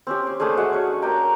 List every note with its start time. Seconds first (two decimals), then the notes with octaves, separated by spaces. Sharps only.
0.07 C4 C#4 G4
0.27 C4
0.40 A3 C#4 D4 G#4
0.57 G#3 F#4 F#5
0.72 C#4 C#5
1.02 G4 A#4 G5 A#5